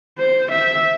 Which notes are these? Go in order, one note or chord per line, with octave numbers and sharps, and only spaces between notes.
C5
E5